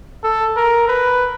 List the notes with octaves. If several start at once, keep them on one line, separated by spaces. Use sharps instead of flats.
A4
A#4
B4